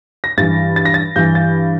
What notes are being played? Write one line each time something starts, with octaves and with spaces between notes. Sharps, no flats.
A#6
G2 E3 A6
A6
A#6
A6
G2 E3 G6
A6